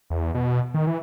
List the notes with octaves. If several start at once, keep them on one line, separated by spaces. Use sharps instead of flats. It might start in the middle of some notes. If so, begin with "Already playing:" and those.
E2
B2
D#3
E3